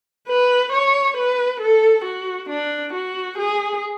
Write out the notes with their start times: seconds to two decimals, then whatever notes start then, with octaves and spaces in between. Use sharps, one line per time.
0.28 B4
0.72 C#5
1.16 B4
1.60 A4
2.05 F#4
2.49 D4
2.94 F#4
3.38 G#4